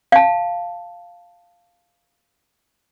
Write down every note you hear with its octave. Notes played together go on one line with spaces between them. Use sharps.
F5 A5